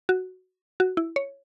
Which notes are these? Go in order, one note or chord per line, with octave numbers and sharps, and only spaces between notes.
F#4
F#4
E4
C#5